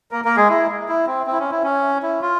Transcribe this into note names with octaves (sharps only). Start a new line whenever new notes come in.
A#3 A#4
A#3 A#4
G#3 G#4
E4
E4
C4
C4
E4
C#4
E4
C#4
E4
F4